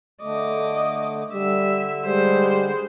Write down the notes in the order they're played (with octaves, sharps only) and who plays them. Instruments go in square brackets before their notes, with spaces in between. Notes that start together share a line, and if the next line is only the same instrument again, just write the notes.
[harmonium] D3 A3 [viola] D#5 D6
[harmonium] D3 [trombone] G3 [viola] E5
[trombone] G3 [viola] G#3 C5